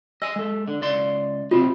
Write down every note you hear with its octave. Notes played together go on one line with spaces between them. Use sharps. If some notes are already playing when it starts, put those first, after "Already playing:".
D#5 G#5 E6
G#3 A4
D3
C#2 D5 C6
C3 C4 D#4 F4